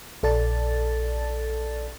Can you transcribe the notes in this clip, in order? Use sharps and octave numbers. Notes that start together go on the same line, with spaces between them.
A#1 A4 D5 A5 A6